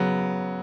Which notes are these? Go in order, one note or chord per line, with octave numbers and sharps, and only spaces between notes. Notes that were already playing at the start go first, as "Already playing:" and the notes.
Already playing: C#3 F#3 B3